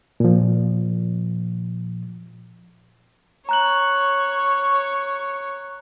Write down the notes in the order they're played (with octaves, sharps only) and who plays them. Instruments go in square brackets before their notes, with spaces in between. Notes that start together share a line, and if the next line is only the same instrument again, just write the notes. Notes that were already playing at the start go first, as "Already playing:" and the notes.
[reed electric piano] A#2 F3
[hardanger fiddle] C#5 C#6 [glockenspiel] A#5 F#6 F#7